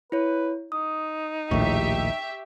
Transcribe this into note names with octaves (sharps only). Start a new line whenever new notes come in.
E4 B4 C#5
D#4 D#6
A#1 D#2 A2 G4 E5 C#6